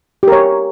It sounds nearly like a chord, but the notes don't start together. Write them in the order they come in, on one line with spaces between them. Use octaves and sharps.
G4 A#4 C#5